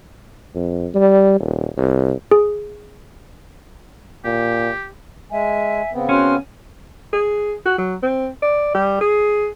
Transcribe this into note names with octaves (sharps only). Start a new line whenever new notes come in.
F2
G3
D#1
C2
G#4
A#2 G4
G#3 E5 G#5
C#3 B3 C4
C#4 F#4 C6 F6
G#4
F#4
F#3
C4
D5
G3
G#4